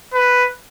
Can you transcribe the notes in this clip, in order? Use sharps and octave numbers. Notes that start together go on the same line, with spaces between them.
B4